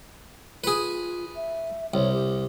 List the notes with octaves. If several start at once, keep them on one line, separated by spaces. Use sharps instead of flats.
F4 G#4 B4
E5
C2 C#5
G4